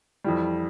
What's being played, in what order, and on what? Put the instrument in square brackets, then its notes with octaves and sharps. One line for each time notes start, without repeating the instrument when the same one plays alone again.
[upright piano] F2 E3 G3